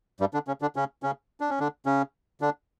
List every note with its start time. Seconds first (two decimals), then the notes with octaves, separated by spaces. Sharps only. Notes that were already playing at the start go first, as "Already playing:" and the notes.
0.20 G2 G3
0.34 D3 D4
0.47 C#3 C#4
0.62 D3 D4
0.76 C#3 C#4
1.03 C#3 C#4
1.41 D4
1.50 C#4
1.60 D3 D4
1.86 C#3 C#4
2.41 D3 D4